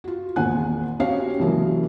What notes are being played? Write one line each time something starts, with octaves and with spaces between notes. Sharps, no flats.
F4 F#4
G#1 E2 A#2 F#5 G#5 F#6
C4 C#4 F#4 G4 C#5 F5
C2 C#3 E3 F#3 G#3 A#3